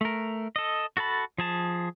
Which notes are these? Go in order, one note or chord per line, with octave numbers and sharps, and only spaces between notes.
A3 A#4
A4 D#5
F#4 A4 A5 B5
F3 G#4 A5